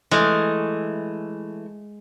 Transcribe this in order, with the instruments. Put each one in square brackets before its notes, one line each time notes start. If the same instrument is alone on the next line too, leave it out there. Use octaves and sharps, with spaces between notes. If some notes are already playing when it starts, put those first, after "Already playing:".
[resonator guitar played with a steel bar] E3 A3 [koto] G#3